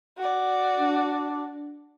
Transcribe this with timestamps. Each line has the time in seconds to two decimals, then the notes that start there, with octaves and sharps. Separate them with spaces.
0.18 F#4 D5
0.76 D4